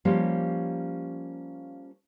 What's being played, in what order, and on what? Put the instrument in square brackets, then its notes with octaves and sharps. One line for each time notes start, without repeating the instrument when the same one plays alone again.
[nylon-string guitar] F3 G3 A#3 C#4 G4